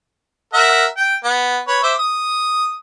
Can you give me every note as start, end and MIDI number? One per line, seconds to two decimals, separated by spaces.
0.53 0.86 70
0.53 0.86 76
0.53 0.86 78
0.97 1.16 79
1.24 1.59 59
1.68 1.80 71
1.68 1.80 73
1.83 1.94 72
1.83 1.94 76
1.83 1.94 86
1.99 2.75 87